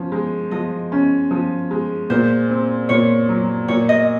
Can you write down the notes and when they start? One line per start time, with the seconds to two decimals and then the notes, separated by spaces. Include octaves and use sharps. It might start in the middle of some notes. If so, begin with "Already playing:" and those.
Already playing: F3 C#4
0.12 G#3
0.51 F3 D#5
0.92 C#4
1.31 F3
1.71 G#3
2.10 A#2 C5
2.50 C4
2.89 A#2 C#5
3.29 F#3
3.68 A#2 C#5
3.89 D#5